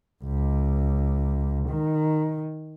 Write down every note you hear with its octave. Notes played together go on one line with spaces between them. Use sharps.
C#2
D#3